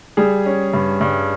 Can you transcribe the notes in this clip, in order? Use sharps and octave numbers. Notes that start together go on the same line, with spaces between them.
G3 G#4
C#4
G2
G2